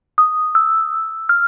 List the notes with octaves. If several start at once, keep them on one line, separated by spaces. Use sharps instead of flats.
D#6
E6
F6